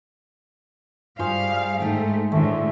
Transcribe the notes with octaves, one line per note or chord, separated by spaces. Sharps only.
G2 G3 G#4 C5 F5 C#6
G#2 A3 D#4 G5
D2 A2 D3 D#3 A3